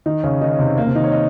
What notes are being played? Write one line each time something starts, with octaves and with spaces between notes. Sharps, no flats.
D#3 D#4
C#3 C#4
D#3 D#4
C#4
C3 C4
A#3
C3 C4
D#3 D#4
C#5
D#5